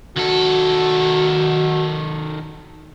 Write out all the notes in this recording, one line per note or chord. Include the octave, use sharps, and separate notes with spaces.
D#3 F#4 A4